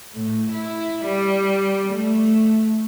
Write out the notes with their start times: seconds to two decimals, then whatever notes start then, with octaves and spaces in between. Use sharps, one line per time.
0.15 A2
0.52 E4
1.05 G3
1.93 A3